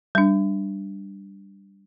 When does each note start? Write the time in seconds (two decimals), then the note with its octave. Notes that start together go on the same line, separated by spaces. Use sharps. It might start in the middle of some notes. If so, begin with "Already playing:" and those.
0.15 G3 D4